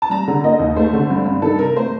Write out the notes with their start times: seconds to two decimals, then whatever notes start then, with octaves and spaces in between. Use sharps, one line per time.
0.02 A5
0.10 G3 A#5
0.28 D3
0.44 A#3 D#5
0.59 D#2
0.76 A3 C5
0.93 D3
1.10 G2
1.26 G2
1.42 D#3 A4
1.59 C3 A#4
1.76 A3 C5